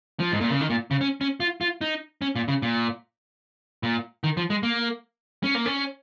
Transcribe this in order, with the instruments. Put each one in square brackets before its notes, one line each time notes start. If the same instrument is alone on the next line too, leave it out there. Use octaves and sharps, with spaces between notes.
[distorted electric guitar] F3
G#2
A#2
C#3
D#3
A#2
C#3
C#4
C#4
F4
F4
D#4
C#4
A#2
C#3
A#2
A#2
D#3
F3
G#3
A#3
C#4
A#3
C#4